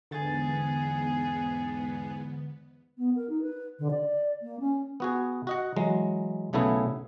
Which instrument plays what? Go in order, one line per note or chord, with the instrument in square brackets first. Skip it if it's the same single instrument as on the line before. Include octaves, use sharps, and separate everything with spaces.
[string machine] E2 G#2 B3 [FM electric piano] D3 A6 [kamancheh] G#4
[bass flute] B3
A#4
D#4
B4
D3
D5
A#3
C#4
[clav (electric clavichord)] B3 F#4 G#4
F#4 D#5 F#5
E3 F#3 G#3
B1 C#3 A3 B3 E4 G#4